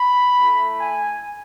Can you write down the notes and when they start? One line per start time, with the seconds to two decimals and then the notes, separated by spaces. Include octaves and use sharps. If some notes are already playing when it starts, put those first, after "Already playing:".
Already playing: B5
0.40 A3 E4
0.78 G#5